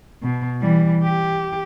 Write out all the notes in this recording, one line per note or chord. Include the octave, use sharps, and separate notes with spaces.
B2
E3 G3
G4